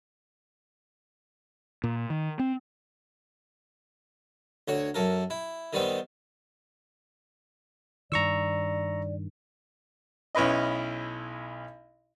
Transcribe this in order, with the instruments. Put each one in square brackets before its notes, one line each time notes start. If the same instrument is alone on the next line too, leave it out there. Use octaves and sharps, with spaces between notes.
[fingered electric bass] A#2
D#3
C4
[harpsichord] D2 F#4 C#5
F#2 A4 A#4
E4
D#3 G3 B3 C4
[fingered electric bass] G2 D#3 [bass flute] D5 [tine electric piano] A#5 C#6 E6
[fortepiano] B1 C#4 E4 B4 D#5